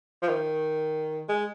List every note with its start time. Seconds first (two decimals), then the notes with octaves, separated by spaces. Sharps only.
0.23 F3
0.29 D#3
1.29 G#3